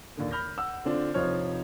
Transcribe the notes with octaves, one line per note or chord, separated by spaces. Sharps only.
D#2 A#2 D3
B5 F6 G6 A#6
F#5 E6
D3 C4 D4 F4
F1 F3 D#4 C5 C#5 F6